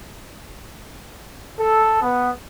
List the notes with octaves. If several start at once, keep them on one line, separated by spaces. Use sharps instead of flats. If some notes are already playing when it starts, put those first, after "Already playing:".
A4
B3